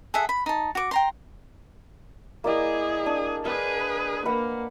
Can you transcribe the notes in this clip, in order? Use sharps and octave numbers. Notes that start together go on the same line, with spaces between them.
G#4 A4 E5 F#5
B5
D#4 A5
F#4 D6
G5 A#5 C6
A#3 E4 G#4 D5 D#5
D4
G#4 B4 F5
A#3 B4 F#5